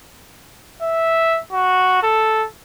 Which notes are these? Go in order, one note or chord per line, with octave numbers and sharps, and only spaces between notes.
E5
F#4
A4